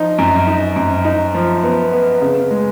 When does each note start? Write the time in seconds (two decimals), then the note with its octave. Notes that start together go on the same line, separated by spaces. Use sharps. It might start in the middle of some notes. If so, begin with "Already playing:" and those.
Already playing: F3 D#4
0.18 F#2
0.47 D#4
0.76 F#2
1.05 D#4
1.34 F3
1.63 B3
1.93 B3
2.22 C#3
2.51 G#3